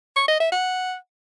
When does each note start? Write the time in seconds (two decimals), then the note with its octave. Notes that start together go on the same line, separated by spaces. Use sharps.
0.16 C#6
0.28 D#5
0.40 E5
0.52 F#5